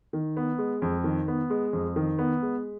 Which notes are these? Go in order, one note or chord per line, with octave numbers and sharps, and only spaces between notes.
D#3
B3
G#3
F2
D#3
B3
G#3
F2
D#3
B3
G#3